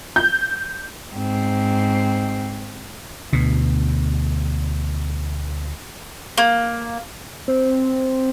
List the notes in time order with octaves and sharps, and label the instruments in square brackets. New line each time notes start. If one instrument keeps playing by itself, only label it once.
[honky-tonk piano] G6
[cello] G#2 C4
[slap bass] D2 B2
[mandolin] A#3
[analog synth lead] C4